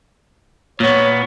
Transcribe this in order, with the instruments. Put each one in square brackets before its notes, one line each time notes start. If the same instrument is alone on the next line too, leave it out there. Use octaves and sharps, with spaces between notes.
[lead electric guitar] A#2 B3 [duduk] C#5